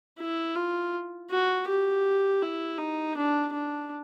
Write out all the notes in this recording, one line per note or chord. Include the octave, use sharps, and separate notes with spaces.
E4
F4
F#4
G4
E4
D#4
D4
D4